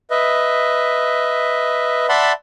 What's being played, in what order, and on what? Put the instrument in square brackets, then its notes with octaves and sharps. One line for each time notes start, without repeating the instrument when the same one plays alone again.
[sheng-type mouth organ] B4 D#5 E5
D5 E5 F#5 A5 B5 C6